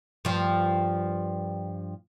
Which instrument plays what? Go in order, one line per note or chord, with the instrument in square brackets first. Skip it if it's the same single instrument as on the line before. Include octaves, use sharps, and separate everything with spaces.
[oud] G2 F3